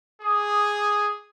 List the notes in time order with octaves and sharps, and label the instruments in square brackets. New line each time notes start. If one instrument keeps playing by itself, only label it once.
[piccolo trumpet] G#4 [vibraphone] D6 D#6